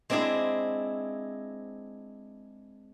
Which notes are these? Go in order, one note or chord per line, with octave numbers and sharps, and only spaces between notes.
G#3 C4 D4 E4 G#4